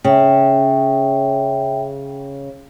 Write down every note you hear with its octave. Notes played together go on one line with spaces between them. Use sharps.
C#3 E5 G5